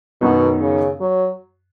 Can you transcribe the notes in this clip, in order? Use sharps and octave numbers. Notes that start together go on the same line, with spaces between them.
F#2 B2 D#3 F#3 B3 D#4
C#3
F#3